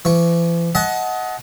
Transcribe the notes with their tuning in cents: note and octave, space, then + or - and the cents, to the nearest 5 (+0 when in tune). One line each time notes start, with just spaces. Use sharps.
E3 +45 C#6 +10
D#5 +25 F#5 +0 A5 -30